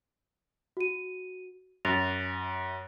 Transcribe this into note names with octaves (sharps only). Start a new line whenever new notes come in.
F#4 D#7
F#2 A6 A#6 F7